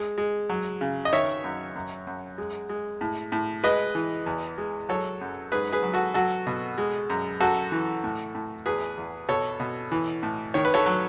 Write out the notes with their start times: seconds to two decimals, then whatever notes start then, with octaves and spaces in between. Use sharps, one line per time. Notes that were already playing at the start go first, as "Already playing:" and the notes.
Already playing: G#3
0.18 G#3
0.49 F#3
0.81 C#3
1.05 D#5
1.13 D#3 C#5 E5
1.44 F#2
1.75 F#2
2.07 F#2
2.38 G#3
2.69 G#3
3.01 A2
3.32 A2
3.63 G#3 B4 D#5
3.95 E3
4.26 E2
4.58 G#3
4.89 F#3 A4 C#5
5.21 F#2
5.52 G#2 G#4 B4
5.72 G#4 B4
5.83 F#3
5.94 F#4 A4
6.14 F#3 F#4 A4
6.47 B2
6.78 G#3
7.10 F#2
7.40 F#2 F#4 A4
7.72 E3
8.04 A2
8.35 A2
8.66 E2 G#4 B4
8.98 E2
9.29 B2 A4 C#5
9.60 B2
9.92 E3
10.23 A2
10.54 D#3 C#5
10.65 B4
10.74 A4 C#5
10.86 F#3